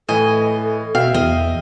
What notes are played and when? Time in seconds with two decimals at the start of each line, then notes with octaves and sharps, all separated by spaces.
0.09 A2 E3 A4 D#5 G#5
0.95 B2 E5 F5 G5
1.14 E2 D#5